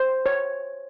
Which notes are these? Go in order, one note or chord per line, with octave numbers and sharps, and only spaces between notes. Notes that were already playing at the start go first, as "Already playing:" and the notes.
Already playing: C5
C#5